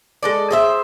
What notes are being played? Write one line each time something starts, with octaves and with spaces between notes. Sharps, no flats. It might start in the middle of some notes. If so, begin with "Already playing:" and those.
G#3 A4 D5
G#4 C5 E5